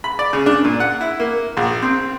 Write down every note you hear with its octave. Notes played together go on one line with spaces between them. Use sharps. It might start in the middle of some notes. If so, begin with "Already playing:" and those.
B5
D5
C#3
D4
A#2
F#5
E4
A#3
A#1
C4